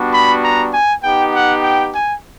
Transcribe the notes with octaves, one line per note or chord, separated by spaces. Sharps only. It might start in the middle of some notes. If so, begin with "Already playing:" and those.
Already playing: G3 B3 D4 F#4
B5
A#5
G#5
B3 D#4 G4 G5
F#5
G5
G#5